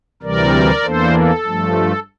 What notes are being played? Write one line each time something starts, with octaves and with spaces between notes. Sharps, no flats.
D2 C3 E3 G3 A#4 D5
E2 E3 A#3 D4 A4 C5
A4
G2 F3 A3